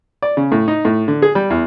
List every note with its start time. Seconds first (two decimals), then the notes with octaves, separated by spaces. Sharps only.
0.22 D5
0.37 C#3
0.52 A2
0.68 D#4
0.85 A2
1.08 D3
1.22 G#4
1.35 G3
1.50 E2